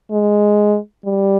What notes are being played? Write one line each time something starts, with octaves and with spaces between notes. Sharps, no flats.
G#3
G3